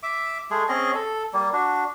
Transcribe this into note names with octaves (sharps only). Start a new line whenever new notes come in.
E5 D6
G#3 A3 G#4
C4 C#4 G#4 D#5
A4
G3 A#3
D4 F#4